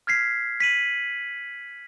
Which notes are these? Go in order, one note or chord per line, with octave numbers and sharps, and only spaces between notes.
F6 G#6 B6 C7
B6 D#7 F#7